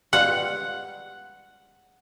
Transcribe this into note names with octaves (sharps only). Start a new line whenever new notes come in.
G3 B3 F4 F#5